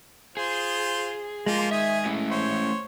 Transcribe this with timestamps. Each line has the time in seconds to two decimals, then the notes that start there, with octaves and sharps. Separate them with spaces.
0.37 F4 G#4 C5
1.46 F3 G#3 A#3 F4
1.71 D#3 G#4 E5 G#5
2.05 A3 C#4 E4
2.31 C5 C#5